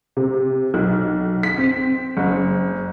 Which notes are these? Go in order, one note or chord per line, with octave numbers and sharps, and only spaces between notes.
C3
B1
B6
C4
F#1